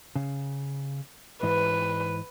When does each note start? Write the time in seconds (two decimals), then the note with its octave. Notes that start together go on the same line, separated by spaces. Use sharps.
0.16 C#3
1.43 G#2 E3 B4